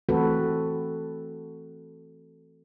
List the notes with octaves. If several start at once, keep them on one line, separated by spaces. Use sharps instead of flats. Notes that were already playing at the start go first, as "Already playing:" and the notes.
E3 A3 C4 F#4 A4 B4